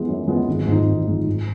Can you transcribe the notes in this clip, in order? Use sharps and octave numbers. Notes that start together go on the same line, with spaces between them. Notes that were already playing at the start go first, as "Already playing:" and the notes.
Already playing: E3 G#3 B3
F#2
E3 G#3 B3
G#1
G#2 E3 G#3 D#4
G#1
G#2 E3 G#3 D#4
G#2